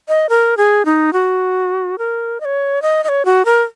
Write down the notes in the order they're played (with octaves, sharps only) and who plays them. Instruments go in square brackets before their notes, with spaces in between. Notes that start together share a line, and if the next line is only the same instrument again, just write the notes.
[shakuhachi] D#5
A#4
G#4
D#4
F#4
A#4
D#5
C#5
D#5
D#5
C#5
F#4
A#4